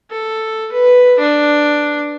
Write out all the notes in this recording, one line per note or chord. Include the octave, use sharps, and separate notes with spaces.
A4
B4
D4